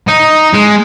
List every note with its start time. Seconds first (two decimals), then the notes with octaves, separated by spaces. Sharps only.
0.08 D#4
0.54 G#3